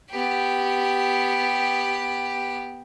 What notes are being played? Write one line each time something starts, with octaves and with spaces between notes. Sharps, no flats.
B3 G4